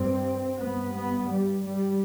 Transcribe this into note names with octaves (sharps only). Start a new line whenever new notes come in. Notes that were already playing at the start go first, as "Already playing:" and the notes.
Already playing: G2 C4
G2 B3
B3
G3
G3